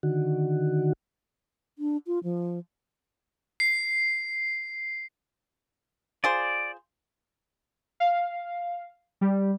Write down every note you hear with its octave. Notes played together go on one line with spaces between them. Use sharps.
D3 D#3 F#4
D4
F4
F3
C7
F4 G#4 C5 D5
F5
G3